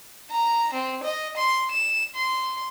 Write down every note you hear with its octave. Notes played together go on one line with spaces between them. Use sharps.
A#5
C4
D#5
C6
E7
C6